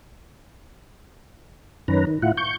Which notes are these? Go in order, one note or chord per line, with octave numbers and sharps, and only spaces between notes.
F#2 D#3 C#4 B4 A#5
D#3
A2 E4 F4 F#5
C#6 G6